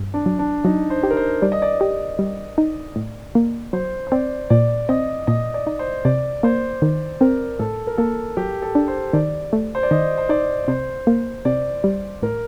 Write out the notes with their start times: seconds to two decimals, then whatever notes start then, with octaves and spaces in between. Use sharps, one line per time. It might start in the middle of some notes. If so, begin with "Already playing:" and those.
Already playing: G2
0.14 D4
0.26 F#3
0.39 D4
0.64 F#3 D#4
0.90 C5
1.03 G4
1.11 A#4
1.17 C5
1.42 G3 D5
1.52 D#5
1.62 D5
1.80 G4 D5
2.19 G3
2.58 D#4
2.96 A2
3.35 A#3
3.73 F#3 C5
4.07 C5
4.12 C4 D5
4.50 A#2 D5
4.89 C4 D#5
5.27 A#2 D#5
5.54 D5
5.67 D#4
5.79 C5
6.05 C3 D5
6.43 A#3 C5
6.82 D#3 C5
7.20 C4 A#4
7.59 A2 A4
7.87 A#4
7.97 A#3 A4
8.37 F#3 G4
8.62 A4
8.75 D4
8.88 C5
9.13 D#3 D5
9.53 A3
9.75 C5
9.83 D5
9.91 D#3 D#5
10.18 C5
10.29 D#4 D5
10.68 C3 C5
11.07 A#3
11.45 C3 D5
11.84 G3
12.22 A2 A#4